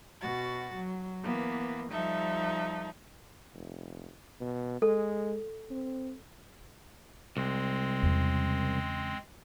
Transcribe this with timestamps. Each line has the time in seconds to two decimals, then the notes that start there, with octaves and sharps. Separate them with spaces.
0.21 B2 F#4 A6
0.75 F#3
1.24 E3 A#3 B3
1.92 F3 G3 D#4 A4 E5
3.54 F1
4.41 B2
4.82 G#3 A4
5.71 C4
7.37 C2 G#3 C4
8.03 E2 C#3